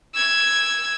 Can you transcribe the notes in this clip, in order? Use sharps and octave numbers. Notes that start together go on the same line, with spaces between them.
E6 G#6